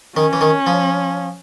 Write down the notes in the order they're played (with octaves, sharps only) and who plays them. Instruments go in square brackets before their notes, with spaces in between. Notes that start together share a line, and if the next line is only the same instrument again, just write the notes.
[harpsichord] D#3 [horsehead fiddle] C#4
[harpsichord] E3
D#3
F3